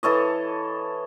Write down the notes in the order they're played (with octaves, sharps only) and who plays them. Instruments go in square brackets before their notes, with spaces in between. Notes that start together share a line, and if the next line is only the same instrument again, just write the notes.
[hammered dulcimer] E3 A4 C#5 D#5